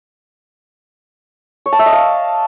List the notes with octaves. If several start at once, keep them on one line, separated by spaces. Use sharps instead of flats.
C#5
A5
E5
D#5
F5